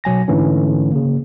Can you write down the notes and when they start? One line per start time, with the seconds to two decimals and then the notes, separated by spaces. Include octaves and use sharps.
0.04 B2 F#3 G#5 A#6
0.28 G#2 D3 E3 A3 C#4
0.92 C#3 A#3